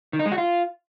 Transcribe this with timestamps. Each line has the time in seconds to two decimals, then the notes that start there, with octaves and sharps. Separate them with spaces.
0.13 D#3
0.19 D#4
0.26 G#3
0.32 F#4
0.38 F4